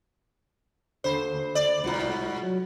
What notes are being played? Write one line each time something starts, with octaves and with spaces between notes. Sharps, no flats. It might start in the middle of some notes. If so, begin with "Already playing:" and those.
D#2 D3 C5 B5
D5
C2 G#2 B2 F4
F#3